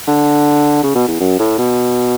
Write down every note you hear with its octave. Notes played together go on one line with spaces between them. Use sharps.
D3
C#3
B2
E2
F#2
A2
B2